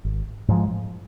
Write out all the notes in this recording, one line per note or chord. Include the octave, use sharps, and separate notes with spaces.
G#1
G#2 F3 G#3